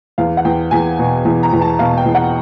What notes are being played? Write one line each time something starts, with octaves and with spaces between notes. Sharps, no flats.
E2 F5
F#5
E2 G5
E2 G#5
B2
E2
A#5
E2
A5
B2 F5
G5
E2
F#5